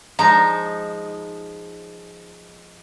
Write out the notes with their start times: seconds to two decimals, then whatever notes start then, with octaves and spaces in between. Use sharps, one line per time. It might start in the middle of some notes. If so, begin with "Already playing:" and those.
0.19 F3 G#3 D#4 A#5